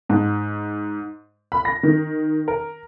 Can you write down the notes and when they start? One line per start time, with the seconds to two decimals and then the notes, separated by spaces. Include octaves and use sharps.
0.09 G#2
1.52 B5
1.65 A#6
1.83 D#3
2.48 A#4